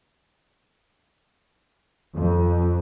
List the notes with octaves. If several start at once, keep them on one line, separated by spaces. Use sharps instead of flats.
F2